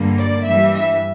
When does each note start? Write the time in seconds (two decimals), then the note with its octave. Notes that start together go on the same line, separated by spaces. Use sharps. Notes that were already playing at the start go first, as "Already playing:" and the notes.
Already playing: G2 D3 G3 A#3
0.16 D5
0.45 G2 E3 G3 E5
0.73 E5